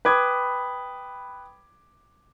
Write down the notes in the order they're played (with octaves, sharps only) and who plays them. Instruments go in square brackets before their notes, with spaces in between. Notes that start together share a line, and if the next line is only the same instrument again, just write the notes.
[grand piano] B4 D6 G#6 [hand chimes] G5 B5 D#6